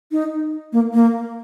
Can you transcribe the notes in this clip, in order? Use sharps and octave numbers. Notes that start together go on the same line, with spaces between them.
D#4
A#3
A#3